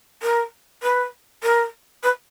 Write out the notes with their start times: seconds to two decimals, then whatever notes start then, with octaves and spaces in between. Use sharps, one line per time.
0.22 A#4
0.83 B4
1.43 A#4
2.03 B4